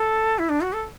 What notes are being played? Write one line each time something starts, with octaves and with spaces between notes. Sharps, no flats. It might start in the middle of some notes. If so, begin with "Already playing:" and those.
Already playing: A4
E4
D4
F#4
A4